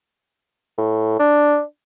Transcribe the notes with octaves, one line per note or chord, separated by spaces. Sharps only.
A2
D4